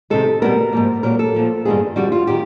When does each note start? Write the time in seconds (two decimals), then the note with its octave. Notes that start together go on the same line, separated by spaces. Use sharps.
0.10 C3 D#3 G#3 A4
0.42 B2 G3 B3 A#4
0.73 G#2 F3 A#3
1.03 A#2 F#3 A#3 A#4
1.19 A4
1.35 A#2 F3 A#3
1.65 G2 D#3 G#3 B3 G#4
1.96 F2 D3 G3 F#4
2.12 F4
2.27 D#3 G4